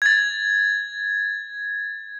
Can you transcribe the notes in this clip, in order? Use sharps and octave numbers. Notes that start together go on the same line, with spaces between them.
G#6 A6